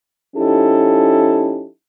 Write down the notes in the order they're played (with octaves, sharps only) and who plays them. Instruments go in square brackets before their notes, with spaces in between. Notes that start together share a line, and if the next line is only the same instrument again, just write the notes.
[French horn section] F3 C#4 D#4 E4 G4 A4